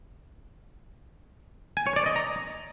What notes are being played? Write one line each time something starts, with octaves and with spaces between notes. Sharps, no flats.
G#5
C#5
D5
D#5
A#5